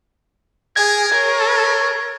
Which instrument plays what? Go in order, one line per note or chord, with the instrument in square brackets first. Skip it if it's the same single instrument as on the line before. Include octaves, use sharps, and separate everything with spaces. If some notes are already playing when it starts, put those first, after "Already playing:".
[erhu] G#4 [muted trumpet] A#4 [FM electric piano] G#6
[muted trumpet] G#4 [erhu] A#4 [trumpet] C#5